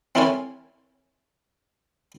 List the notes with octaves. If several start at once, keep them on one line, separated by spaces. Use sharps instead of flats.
C4 E4 A4 A#4 C#5 G#5